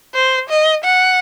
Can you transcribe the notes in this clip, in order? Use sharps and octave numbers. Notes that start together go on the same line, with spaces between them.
C5
D#5
F#5